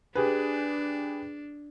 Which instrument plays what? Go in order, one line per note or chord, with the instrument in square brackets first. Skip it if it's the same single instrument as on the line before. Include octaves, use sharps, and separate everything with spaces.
[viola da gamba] D4 [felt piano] G4 G#4 B4